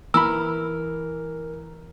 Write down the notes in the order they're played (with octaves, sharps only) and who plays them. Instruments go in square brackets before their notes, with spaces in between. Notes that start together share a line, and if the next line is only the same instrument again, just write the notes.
[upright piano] E3 [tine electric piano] A#4 [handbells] B5 E6